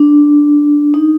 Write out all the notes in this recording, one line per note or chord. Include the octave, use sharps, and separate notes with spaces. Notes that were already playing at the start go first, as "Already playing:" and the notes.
Already playing: D4
D#4